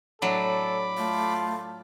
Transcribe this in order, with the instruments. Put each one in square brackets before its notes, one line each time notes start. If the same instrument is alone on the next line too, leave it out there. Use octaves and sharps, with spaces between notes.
[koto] A2 F#3 D4 [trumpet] A4 [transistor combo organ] B5 D6
[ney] A3 [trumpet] F4